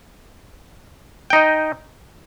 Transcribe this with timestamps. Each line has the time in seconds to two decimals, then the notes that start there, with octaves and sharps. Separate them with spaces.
1.30 G5
1.33 D#4
1.36 D#5